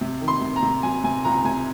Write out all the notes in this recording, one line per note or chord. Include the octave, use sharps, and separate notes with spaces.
C3
D#3
C6
C3
A#5
C3
F#3 G#5
C3 G#5
C#2 A#5
C3 G#5